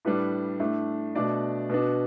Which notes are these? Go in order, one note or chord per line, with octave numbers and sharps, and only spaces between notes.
A2 G3 D4 B4
A2 A3 D4
B2 A3 D4 D5
B2 B3 D4